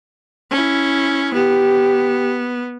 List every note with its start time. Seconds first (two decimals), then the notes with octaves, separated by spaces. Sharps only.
0.51 C#4 E4
1.33 B3 G4